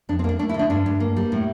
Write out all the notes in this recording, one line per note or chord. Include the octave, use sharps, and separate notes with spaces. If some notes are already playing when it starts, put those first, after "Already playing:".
F2 D4
C4
A#3 D4
A3 D4
E4
D3
D4
G2 D4
G2
A#3
G3
A2